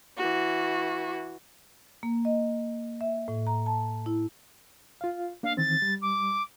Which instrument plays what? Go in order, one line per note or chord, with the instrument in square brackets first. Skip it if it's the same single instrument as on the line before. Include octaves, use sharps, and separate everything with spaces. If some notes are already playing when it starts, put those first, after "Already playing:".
[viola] E3 F#4
[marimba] A#3
D#5
E5
A2
A#5
A5
E4
[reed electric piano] F4 F5
[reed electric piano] A#3 D4 [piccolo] F5
[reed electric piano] D#3 E3 C4 [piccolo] A6
[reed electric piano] G3
[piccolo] D6